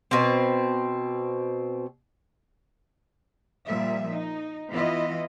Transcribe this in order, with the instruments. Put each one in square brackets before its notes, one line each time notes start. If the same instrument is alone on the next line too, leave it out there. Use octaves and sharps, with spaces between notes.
[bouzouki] B2 C4
[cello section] A#2 F3 G3 E5
D#4
E3 B3 E4 F4 D#5